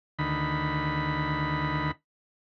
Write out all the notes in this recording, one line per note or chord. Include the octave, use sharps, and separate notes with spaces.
D2 D#3 B5